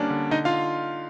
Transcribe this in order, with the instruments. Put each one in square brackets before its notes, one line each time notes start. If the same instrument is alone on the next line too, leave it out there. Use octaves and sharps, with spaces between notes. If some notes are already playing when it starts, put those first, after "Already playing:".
Already playing: [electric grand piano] D3 G3 A#3 C#4 D4 D5
D3
D3 D#4 D#5
F4 F5